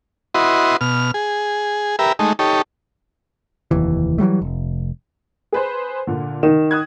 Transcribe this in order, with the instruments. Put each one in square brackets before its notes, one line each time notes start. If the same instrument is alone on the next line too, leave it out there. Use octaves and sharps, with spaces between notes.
[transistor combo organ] E4 F#4 B4 D#5 C6
B2 F6
G#4
G4 A#4 B4 E5
G#3 A3 D#4
D#4 G4 A4 C#5
[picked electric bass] F1 D#2 E3
E3 F#3 G3 A3
F1
[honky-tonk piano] G#4 B4 C5
A#2 D3
[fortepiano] D#3 [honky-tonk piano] E7
[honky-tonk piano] D#6 F#6 G#6